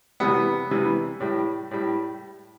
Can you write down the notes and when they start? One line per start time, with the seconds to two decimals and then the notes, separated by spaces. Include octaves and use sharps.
0.20 C3 E3 G3 B3
0.71 C3 E3 G3
1.20 A2 G3
1.71 A2 G3